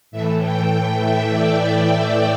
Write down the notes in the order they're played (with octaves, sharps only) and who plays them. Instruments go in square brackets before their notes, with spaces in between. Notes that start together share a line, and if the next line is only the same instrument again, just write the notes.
[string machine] A2 E3 A3 E5
G5
G5
E5
D5
D5
E5